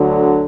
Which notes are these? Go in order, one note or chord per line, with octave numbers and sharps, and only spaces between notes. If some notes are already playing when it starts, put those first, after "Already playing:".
Already playing: D2 D3 F#3